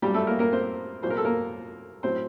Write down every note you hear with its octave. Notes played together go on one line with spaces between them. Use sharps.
A1 G2 F#3 G3 G4
A3 A4
A#3 A#4
A#3 A#4
C4 C5
C2 A#2 F#3 C5
A#4
A4
A#3 A#4
A2 F#3 C4 C5